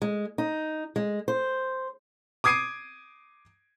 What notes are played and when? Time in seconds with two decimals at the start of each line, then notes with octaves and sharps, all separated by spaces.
0.02 G#3
0.38 D#4
0.96 G#3
1.28 C5
2.44 D6 D#6 G#6 C7 D7 D#7